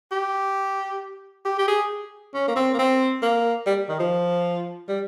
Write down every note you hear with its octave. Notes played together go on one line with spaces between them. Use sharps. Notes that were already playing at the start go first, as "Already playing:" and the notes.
G4
G4
G4
G#4
C#4
A#3
C4
A#3
C4
A#3
G3
D#3
F3
G3